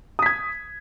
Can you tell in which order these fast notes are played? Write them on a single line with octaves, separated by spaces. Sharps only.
D#6 B6 G#6